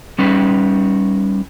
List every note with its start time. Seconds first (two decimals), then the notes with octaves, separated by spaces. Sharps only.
0.19 G3 C#4 D#4 B4